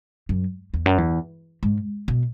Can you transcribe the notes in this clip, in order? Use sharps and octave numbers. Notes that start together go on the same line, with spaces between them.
F#2
E2
F#2
E2
G#2
B2